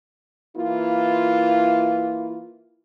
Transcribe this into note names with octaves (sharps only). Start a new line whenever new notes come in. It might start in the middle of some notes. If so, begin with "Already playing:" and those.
E3 A#3 E4 F4